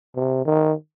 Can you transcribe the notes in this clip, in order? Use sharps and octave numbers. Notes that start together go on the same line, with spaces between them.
C3
D#3